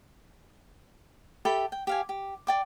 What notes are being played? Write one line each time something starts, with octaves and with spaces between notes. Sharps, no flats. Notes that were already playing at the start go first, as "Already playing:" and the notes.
G4 A4 E5 B5
G5
G4 F5 G#5
G4
D5 G5 D6